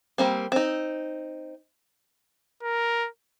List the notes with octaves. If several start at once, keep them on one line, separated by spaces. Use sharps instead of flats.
G3 A#3 C4
C4 D#4
A#4